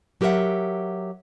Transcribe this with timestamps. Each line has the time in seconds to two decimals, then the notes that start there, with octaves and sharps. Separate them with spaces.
0.21 F#3 G4 A#4 B4 E5 F#5